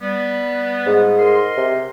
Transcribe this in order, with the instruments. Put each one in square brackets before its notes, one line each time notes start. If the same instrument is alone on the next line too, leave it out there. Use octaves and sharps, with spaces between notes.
[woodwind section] G3 B3
[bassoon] G#2
[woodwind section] A#4 D#5 C6
[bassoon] C3